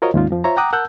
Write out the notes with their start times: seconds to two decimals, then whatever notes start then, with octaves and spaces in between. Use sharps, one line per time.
0.02 F4 F#4 A#4 C5 C#5 D#5
0.14 D#2 G#2 G#3 C#4 D#4 F4
0.30 F2 F3
0.44 F4 C5 C#5 E5 A#5
0.57 F#5 G5 A#5 D6 D#6 F#6
0.73 A#4 F#5 A5 E6 F#6 G6